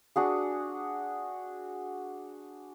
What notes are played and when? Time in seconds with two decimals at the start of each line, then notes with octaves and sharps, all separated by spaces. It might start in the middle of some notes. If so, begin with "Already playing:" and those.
0.16 D4 F#4 G#4